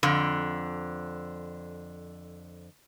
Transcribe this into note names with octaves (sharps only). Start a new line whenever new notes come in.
F2 D3